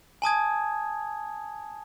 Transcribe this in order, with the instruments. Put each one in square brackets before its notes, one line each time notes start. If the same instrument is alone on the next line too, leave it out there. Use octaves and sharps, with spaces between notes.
[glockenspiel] G#5 A5 D#6 G#6